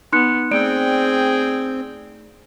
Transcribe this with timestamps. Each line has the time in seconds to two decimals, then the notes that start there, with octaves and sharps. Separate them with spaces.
0.13 B3 D#4 C6 F#6 C#7
0.51 A3 C4 G#4 D5 G5 D7